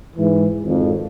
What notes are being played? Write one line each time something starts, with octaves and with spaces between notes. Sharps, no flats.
G#2 E3
G#1 F2